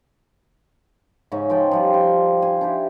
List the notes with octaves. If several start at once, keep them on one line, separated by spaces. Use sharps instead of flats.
G#2 C#3 C#4 D#4
F3 D#4 G5 A5
F3 G3 F4
G5 C6
C5 G#5 C6
D4 E4 G4